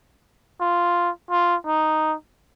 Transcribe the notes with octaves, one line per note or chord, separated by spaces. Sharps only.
F4
F4
D#4